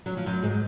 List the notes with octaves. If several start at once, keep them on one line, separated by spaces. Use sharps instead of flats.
F#3
F3
F#2 F#3
G#2 G#3